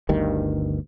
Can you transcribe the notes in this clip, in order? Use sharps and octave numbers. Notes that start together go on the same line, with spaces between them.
G1 D2 G2 D#3